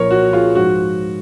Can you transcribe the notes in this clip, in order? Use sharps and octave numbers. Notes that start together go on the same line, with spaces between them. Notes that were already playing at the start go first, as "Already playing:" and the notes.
Already playing: A#2 F3 A#4 C#5
F#4
F4 G#4
G#2 F3 F#4